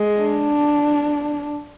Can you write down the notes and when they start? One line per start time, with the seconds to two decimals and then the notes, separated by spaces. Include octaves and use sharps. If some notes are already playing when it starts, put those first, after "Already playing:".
Already playing: G#3
0.20 D4